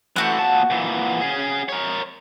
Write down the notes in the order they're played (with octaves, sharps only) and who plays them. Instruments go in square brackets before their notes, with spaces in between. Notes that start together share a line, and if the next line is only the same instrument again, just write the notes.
[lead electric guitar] E3 A3 [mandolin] C4 F#4 F#5
[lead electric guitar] A#2 A5
A#2 E3
C#4 G#4
A#4 C#5